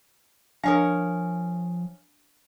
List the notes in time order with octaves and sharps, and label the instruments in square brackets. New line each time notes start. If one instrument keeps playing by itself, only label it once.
[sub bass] F3 [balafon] D4 [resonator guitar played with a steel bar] A#4 C#5 F5 [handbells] G#5 D#6